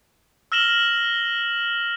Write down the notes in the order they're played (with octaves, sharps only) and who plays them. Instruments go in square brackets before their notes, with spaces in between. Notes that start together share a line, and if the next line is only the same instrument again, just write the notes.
[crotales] E6 F6 A#6 E7 F#7 G7